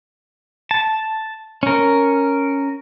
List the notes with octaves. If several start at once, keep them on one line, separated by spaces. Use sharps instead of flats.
A5
C#4 A#4